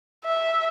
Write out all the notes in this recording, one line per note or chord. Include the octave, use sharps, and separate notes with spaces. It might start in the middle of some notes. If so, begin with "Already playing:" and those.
E5